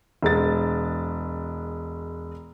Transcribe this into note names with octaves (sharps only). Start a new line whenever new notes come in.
E1 G#3 A6